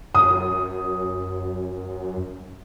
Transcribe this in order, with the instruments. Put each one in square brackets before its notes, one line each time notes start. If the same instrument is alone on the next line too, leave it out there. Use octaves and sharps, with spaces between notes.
[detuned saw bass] F#2 [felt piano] D#6